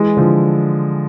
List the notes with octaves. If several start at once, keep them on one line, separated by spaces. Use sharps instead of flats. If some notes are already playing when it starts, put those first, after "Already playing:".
Already playing: E3 G#3
D3 F3